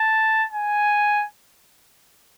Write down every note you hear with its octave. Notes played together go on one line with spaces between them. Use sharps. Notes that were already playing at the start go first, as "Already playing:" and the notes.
Already playing: A5
G#5